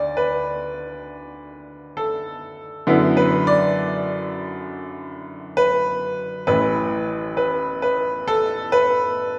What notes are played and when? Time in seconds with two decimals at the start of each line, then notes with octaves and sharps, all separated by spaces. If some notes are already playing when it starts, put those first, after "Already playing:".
Already playing: D2 D3 D5
0.17 B4
1.97 A4
2.87 F#2 D3 B3 E4
3.17 B4
3.47 D5
5.57 B4
6.47 A1 A2 E3 B4
7.37 B4
7.82 B4
8.28 A4
8.72 B4